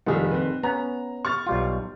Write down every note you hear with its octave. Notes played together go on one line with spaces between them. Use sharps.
F1 A#1 D#3 G3 G#4 A4
C4 B4
B3 C#4 A#5
C#6 F6 A6
B1 G3 F4